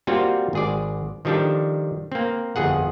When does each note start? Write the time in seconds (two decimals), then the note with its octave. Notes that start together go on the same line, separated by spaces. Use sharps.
0.07 G3 A#3 C4 F4 F#4
0.53 G#1 G#4 D5
1.25 D#3 F3 G3 D4 A4
2.12 A#3 C4
2.56 G1 F2 G#4 F#5